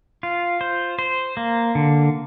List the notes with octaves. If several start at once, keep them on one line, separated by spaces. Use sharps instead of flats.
F4
C5
C5
A#3
D3